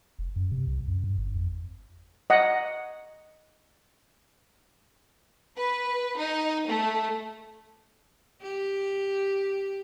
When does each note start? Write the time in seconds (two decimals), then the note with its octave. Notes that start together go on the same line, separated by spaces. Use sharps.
0.19 F1
0.36 F#2
0.51 C3
0.67 C2
0.88 F#2
1.04 G2
1.18 G1
1.36 F2
2.30 D#5 F#5
5.57 B4
6.17 D#4
6.68 A3
8.42 G4